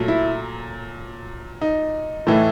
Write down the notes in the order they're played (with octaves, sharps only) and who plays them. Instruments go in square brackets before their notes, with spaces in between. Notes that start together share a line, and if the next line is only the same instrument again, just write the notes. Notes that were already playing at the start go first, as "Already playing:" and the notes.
Already playing: [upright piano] A#2 F#3 A3
E4
D#4
A2 E3 A3